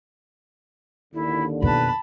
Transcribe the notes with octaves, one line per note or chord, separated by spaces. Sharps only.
D#2 A#2 D3 E4
F2 B2 B4 A5 B5